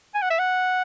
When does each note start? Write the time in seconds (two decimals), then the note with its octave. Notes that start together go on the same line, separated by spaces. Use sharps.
0.15 G#5
0.22 F#5
0.30 E5
0.39 F#5